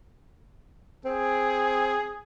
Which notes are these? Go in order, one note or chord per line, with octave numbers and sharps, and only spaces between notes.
C4 G#4